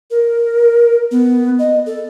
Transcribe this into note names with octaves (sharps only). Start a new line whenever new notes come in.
A#4
B3
D#5
A4